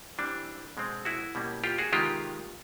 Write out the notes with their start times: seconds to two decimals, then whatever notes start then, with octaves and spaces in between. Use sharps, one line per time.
0.18 E3 G3 C4 D4
0.77 B2 G#3 C4
1.05 E4 F#4
1.35 B2 G3 A#3 C#4
1.64 F4 G4
1.78 F#4 G#4
1.92 C3 D#3 G#3 B3 F4 G4